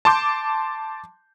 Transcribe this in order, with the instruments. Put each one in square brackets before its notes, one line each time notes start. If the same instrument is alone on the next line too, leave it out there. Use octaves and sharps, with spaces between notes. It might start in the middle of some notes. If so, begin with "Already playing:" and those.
[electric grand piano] A5 C6 D6 G6